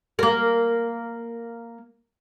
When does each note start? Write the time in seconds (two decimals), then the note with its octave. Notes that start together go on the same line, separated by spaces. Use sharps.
0.19 A#3 A#4